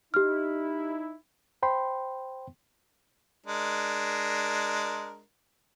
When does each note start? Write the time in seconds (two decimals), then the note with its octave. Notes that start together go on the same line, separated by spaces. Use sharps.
0.14 D#4 E4 G4 F6
1.63 C5 G5 B5 C6
3.46 G#3 D4 A#4